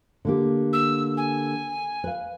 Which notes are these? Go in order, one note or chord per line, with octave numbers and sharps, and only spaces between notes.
D3 A#3 G4
E6
G#5
B4 F5